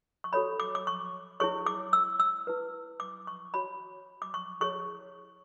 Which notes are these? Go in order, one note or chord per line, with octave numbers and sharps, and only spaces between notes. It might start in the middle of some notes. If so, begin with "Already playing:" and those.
C#6
F#4 A4 C#5 B5
D6
D6
C#6
E4 G#4 C#5 C#6
D6
E6
E6
E4 B4
D6
C#6
F#4 C#5 B5
D6
C#6
E4 G#4 C#5 C#6